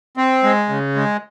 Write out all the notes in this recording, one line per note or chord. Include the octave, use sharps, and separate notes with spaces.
C4
G#3
C#3
G#3